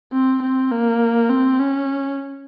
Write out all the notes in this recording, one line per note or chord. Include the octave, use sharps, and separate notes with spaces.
C4
C4
A#3
C4
C#4